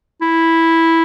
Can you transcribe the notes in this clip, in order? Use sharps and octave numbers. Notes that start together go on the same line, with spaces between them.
E4